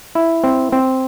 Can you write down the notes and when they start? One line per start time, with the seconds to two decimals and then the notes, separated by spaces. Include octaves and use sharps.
0.15 E4
0.44 C4
0.72 C4